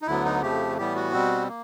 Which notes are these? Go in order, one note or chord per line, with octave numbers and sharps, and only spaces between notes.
D#4
D2 D3 F#3 B3 E4
D#4
F2 C#3 F3 A3 G4
A2 E3 G3 B3 G4
F#4
B2 G3 C4
A#3